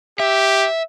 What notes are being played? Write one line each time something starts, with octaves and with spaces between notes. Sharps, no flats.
G4 E5